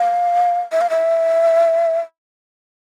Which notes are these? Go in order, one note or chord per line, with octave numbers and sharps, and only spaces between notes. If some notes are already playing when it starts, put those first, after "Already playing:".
Already playing: F5
E5
F5
E5